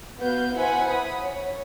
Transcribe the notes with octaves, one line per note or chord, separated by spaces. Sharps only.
B3 F#4 B4 F5 G6
E4 B4 C5 F#5 G#5 B5
B5 D#6
C#5